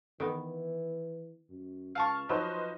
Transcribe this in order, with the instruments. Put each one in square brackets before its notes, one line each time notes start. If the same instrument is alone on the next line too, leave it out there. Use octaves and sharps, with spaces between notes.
[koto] D#3 B3 [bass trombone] E3
[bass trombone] F#2
[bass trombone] C#2 [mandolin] F5 A5 C#6 [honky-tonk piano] F6
[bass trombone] F3 [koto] F#3 [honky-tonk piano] D#4 B4 C5